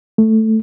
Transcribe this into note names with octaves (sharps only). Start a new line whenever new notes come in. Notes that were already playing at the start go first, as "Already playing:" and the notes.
A3